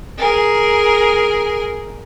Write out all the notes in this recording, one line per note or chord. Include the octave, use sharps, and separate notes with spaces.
G#4 A#4